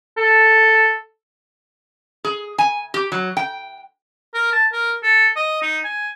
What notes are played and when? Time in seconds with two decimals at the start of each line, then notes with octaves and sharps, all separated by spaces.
0.18 A4
2.24 G#4
2.58 G#5
2.94 G4
3.12 F#3
3.37 G5
4.34 A#4
4.53 A5
4.73 A#4
5.03 A4
5.36 D#5
5.62 D#4
5.84 G#5